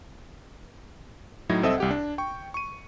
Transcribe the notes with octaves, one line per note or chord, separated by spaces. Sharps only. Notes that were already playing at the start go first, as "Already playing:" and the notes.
A2 F#3 D#4 E4 G#6 A#6
C2 C4 A4 D#5 E5 D#6
C2 G4 F#5
D4
G5 C#6
C#6 D#7